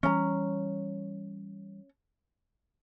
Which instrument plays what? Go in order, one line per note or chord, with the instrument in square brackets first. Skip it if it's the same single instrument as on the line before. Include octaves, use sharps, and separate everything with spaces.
[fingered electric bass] E3 G3 [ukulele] C#4 A#5